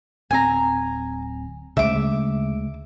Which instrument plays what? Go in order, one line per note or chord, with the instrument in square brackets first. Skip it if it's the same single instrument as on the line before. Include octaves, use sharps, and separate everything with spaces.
[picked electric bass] D1 C4 [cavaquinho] G#5 A#5
[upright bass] D2 G#3 [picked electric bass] C#3 [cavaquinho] E5 D6